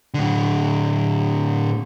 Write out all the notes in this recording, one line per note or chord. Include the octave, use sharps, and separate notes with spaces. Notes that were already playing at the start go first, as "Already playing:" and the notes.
A2 D3